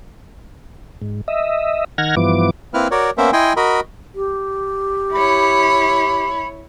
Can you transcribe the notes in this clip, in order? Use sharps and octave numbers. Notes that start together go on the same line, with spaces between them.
G#2
D#5 E5
D#3 F#5 F6 G#6 A#6
G2 E3 F3 B3 D6
A#3 C4 E4 B4 F6
F#4 A#4 C#5 D5
A#3 B3 C#4 A#4 C5 E5
E4 D#5 G5 G#5 C6
F#4 A#4 D#5 B5
G4
E4 C#5 B5